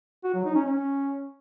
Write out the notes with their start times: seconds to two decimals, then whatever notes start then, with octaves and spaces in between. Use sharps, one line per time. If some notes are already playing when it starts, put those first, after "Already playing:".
0.24 F#4
0.34 F#3
0.45 D#4
0.55 C#4
0.66 C#4